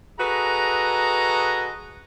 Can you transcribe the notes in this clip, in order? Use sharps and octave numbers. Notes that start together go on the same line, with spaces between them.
F#4 G#4 A4 B4 D#5 A#5